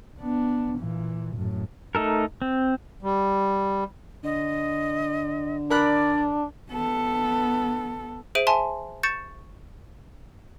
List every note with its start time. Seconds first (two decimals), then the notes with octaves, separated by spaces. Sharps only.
0.19 B3 D4
0.79 A#2 E3
1.36 F#2 A2
1.95 A3 D#4 A4 A#4
2.42 C4
3.03 G3
4.24 D3 D#5
5.70 D4 A#4 D5 B5 F#6
6.70 B3 A4
8.35 G#4 C5 E5 D7 D#7
8.47 E5 G#5 A5 C6
9.03 C#6 G6 A6 C#7 E7